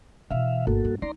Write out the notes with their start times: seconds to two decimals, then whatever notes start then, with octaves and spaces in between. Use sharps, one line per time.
0.31 B2 E3 E5 F5
0.67 G1 A#3 F#4 A4
0.85 G2
1.02 D#4 D5 A#5 C6